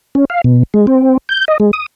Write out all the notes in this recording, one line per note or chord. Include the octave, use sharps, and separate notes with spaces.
C#4
F5
B2
G#3
C4
G6
D#5
G#3
D#6